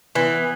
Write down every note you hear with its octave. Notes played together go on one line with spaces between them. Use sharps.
E3 B3